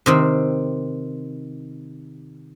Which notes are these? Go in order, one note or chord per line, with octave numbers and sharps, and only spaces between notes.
C3 D#3 C4